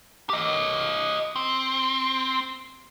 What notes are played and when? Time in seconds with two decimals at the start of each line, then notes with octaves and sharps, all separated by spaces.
0.30 G4 D#5
1.36 C4